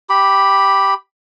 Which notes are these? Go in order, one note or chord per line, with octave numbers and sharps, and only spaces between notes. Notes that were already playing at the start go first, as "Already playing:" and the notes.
G4 B5